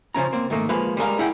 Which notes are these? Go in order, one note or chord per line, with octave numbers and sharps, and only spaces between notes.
C#3 F3 C#4 A#5
A#3 C4
G#2 D#3 A3 A#3
F3 G#3 A#3 B4 F5
G3 G#3 A#4 F5
E4 G#4 F#5 G5